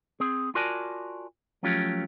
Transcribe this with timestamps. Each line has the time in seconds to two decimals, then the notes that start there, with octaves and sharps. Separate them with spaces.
0.20 C4 G#4
0.55 F4 F#4 A#4 D5 G#5 A5
1.63 F3 F#3 A3 C#4 F4 G4